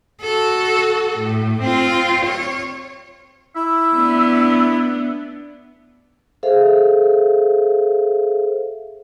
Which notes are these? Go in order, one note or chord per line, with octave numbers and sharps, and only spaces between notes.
F#4 A4
A2
C4 F4
C#5
E4 E5
B3 D4
G#4 A4 C5 E5 F5